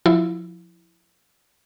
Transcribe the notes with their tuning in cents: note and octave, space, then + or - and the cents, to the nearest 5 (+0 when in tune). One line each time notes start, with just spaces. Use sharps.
F3 +20 E4 +0